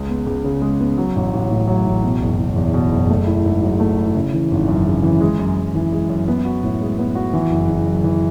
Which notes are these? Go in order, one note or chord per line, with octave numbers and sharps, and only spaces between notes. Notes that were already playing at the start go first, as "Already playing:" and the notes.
Already playing: C#2 G#3
B3
C#2
C#3
G#3
B3
F#3
A1
A1
A2
F#3
A1
B2
F#1
F#1
E2
B2
F#1
A3
E4
G#2
F#3
A3
E4
C#3
E3
G#1
F#2
C#3
E3
G#3
F#2
F#2
E3
G#3
F#2
B3
F#4
A2
G#3
B3
F#4
E3
F#1
F#1
F#2
E3